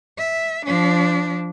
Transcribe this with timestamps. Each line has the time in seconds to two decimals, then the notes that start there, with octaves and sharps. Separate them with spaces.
0.18 E5
0.66 F3 D4